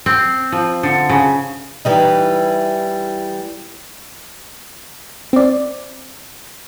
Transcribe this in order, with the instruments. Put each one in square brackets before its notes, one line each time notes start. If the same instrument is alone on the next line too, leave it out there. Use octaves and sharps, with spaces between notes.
[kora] C4
F3
D3
C#3
[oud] E3 G3 D#4
[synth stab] C4 D5